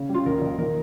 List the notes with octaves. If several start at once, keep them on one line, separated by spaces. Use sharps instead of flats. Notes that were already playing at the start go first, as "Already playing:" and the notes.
Already playing: C#3
G3
F4
D#2 A#4
D#2
D#3 A#4